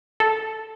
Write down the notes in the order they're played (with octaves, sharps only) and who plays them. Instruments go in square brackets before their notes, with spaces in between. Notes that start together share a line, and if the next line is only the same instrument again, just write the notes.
[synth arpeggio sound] A4